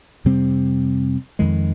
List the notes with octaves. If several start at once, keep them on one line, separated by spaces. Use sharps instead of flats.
F2 C3 G3 C4
F2 D#3 G#3